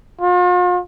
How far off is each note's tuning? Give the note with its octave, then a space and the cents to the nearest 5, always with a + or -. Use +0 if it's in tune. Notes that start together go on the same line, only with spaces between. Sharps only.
F4 +40